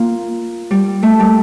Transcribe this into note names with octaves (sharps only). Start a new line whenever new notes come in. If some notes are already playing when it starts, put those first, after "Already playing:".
Already playing: A#3 F4
G3
A3
G3